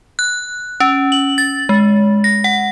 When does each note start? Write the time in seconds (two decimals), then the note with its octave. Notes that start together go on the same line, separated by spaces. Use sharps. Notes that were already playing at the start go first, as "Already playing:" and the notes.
0.19 F#6
0.80 C#4
1.12 F#7
1.38 A6
1.69 G#3
2.24 A#6
2.44 F#5